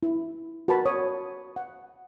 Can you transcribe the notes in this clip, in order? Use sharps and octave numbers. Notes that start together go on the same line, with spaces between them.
E4
F#4 A#4 B4 A5 B5
C#5 D#6
F#5